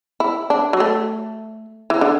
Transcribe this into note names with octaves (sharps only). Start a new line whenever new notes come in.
E4
D4
F#3
A3
E3
D3